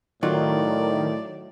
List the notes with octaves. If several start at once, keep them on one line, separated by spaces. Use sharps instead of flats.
A2 D#3 F#3 F4 D5